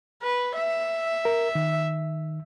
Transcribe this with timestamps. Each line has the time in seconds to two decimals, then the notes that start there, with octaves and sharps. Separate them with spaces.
0.23 B4
0.56 E5
1.25 A#4
1.55 D#3